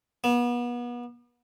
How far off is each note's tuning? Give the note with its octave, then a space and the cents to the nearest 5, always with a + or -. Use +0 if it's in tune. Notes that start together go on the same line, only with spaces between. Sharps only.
B3 -35